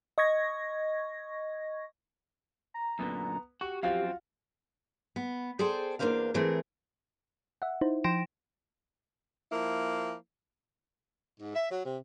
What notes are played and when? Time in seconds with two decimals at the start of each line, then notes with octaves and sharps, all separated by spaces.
0.18 D#5 C#6 G#6 A#6
2.74 A#5
2.99 F#2 A#2 D3 B3
3.61 F#4 G4 C#6
3.83 F#2 F3 C4 F4 F#4 F5
5.16 B3
5.59 G#4 A4 C5 D5 G5
5.99 E2 E3 A#3 D4 C5 F5
6.34 E3 A3 C4 G#4 A#4
7.62 E5 F#5
7.81 D#4 E4 C5
8.04 F3 G5 C6 A#6 D7 E7
9.52 F3 A#3 E4
11.39 G#2
11.55 E5
11.70 F#3
11.84 C3